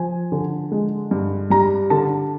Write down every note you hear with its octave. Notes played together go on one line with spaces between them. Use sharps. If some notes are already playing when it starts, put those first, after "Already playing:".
Already playing: F3 G#5
D3
G#3
G2
G3 A#5
D3 A5